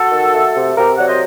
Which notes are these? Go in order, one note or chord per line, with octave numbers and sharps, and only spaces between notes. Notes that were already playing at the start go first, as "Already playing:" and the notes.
Already playing: F#4 A4
D#3
A3
C3
C3 G4 A#4
F#3 D5 F#5
C5 D#5